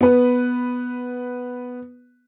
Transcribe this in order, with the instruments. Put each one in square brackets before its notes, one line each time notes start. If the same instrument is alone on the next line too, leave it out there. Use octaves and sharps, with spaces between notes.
[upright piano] B3 B4